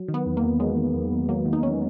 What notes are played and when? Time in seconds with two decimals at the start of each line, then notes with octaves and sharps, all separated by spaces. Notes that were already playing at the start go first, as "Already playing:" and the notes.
Already playing: F#3
0.08 D#3
0.14 B3
0.26 E2
0.37 A#3
0.43 E2
0.60 F#3 G#3
0.76 D#3
0.94 E2
1.11 E2
1.29 F#3 A#3
1.45 D#3
1.53 D#4
1.63 E2 C#4